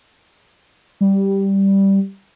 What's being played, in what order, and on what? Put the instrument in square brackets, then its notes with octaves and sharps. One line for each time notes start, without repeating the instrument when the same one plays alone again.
[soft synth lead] G3